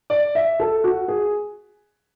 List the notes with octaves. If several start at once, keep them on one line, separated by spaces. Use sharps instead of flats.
D5
E5
A4
F#4
G#4